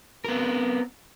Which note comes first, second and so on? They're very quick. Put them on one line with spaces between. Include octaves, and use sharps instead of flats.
A#4 B3 C4